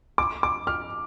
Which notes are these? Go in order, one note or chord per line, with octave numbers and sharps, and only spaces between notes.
D6
D6
F6